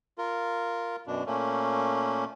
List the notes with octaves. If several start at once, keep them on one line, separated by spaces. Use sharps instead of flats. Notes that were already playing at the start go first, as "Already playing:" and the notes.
F4 A#4
F#2 B2 D4
A#2 A3 A#3 C#4